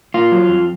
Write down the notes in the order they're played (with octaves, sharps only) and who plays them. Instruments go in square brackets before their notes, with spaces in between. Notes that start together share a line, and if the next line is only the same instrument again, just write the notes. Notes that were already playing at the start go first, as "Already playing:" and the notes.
[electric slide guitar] A#3 F4
F#3
F2